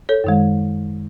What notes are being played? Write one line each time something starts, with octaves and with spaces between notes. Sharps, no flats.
A4 C#5
F#2 D#3 G#3